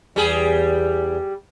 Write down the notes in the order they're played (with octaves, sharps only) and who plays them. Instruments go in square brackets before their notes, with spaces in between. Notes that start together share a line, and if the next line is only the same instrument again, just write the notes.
[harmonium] E2 [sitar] G3 G#4